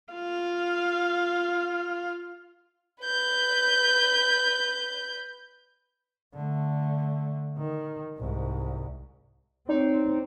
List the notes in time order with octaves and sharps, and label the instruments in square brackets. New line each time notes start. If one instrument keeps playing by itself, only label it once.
[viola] F4 F5
[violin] B4 G6
[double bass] D3 A3
D#3
C2 G#2
[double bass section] C4 [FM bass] D#4 [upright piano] C#5 D5